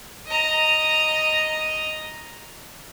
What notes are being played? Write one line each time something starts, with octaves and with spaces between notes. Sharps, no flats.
D#5 A#5